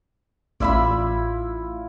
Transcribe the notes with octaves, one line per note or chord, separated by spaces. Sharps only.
A1 E4 F4 D5 E5 B5